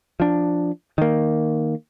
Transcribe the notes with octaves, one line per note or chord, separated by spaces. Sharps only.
F3 D4
D#3 A#3